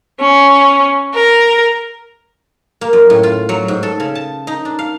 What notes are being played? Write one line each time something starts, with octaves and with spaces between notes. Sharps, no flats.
C#4
A#4
A#3
F#2
A2
F4
F#3
G#2
A4
C#3
A5
D#4
D4
F5